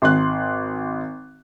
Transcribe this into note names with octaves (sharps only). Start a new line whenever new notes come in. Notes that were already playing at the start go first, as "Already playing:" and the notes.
G#1 C6 F#6